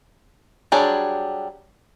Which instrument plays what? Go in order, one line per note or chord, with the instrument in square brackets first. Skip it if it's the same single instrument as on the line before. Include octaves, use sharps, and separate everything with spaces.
[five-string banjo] F#3 G3 D4 G#4